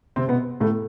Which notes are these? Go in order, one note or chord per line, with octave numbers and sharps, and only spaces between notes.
C3 C4
B2 B3
A2 A3